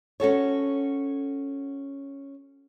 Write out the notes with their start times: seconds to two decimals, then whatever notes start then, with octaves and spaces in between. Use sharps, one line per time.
0.20 C#4 F#4 A4 C#5